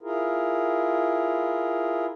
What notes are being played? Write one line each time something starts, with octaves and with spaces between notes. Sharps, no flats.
E4 F4 G#4 A#4